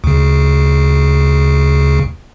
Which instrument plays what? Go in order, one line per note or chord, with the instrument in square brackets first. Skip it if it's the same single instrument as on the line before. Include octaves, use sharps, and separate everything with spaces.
[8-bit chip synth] D2 C#3